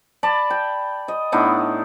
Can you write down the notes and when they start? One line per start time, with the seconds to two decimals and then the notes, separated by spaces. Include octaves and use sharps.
0.23 D5 A5 B5
0.50 G5
1.08 D#5
1.32 A2 B3 D4 D#4